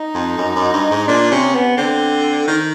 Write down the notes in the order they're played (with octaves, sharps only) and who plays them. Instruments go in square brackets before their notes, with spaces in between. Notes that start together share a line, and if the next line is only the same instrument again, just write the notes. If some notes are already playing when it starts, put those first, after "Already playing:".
Already playing: [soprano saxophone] D#4
[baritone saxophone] F2
F#2
F#2
G2
G#2
[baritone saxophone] A#2 [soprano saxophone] D4
[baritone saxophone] C3 [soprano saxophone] C#4
[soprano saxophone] B3
[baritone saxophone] D3 [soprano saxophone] C4
[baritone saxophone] D#3